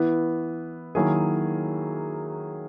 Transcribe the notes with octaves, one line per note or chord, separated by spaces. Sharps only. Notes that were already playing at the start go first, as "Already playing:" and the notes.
Already playing: E3 B3 E4
D#3 F#3 A#3 E4 G#4